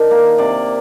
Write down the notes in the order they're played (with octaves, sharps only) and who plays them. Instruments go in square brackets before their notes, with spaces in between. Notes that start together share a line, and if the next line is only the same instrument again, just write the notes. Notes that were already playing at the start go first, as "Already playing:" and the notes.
Already playing: [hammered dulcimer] D#3 D4 D#5
A#3
C3 D5